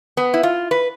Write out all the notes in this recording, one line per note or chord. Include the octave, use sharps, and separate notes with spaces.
B3
E4
F4
B4